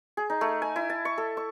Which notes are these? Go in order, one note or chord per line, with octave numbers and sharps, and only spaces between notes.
G#4
D#4
A3
G#5
E4
A5
C#6
A4
C#6